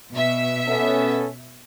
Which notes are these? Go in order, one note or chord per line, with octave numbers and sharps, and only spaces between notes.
B2 E5
B3 C#4 A4